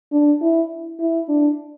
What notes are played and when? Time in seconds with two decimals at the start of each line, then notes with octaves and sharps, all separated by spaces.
0.12 D4
0.41 E4
1.00 E4
1.29 D4